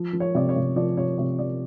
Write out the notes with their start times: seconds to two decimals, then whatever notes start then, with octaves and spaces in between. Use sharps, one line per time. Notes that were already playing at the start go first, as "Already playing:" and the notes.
Already playing: F3
0.13 F3
0.20 C#5
0.35 C3 D5
0.49 C#5
0.56 C3
0.76 F3 D5
0.97 C3 C#5
1.18 C3 C#5
1.39 F3 D5